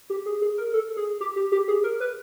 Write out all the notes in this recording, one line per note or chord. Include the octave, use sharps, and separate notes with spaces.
G4
G#4
G#4
A#4
A4
G#4
G4
G4
G4
G#4
A#4
B4